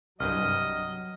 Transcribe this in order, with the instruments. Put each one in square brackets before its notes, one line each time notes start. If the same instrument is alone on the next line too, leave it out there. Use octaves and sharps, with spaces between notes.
[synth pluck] C2 G2 [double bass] F#3 [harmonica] D#5 [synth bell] F6